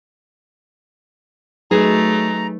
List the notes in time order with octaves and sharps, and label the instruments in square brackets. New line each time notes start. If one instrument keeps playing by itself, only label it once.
[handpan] F#3 D#4 B4 [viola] A3 [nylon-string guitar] G#4 [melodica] A#5